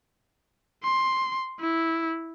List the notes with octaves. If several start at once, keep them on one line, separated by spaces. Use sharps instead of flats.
C6
E4